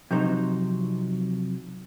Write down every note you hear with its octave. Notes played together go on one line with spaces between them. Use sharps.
C3 F3 F#3 D#4 C5